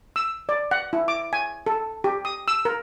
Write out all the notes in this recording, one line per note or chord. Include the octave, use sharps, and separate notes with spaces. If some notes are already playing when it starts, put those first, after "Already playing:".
E6
D5
F#5
E4
D6
G#5
A4
G4
D#6
E6
A#4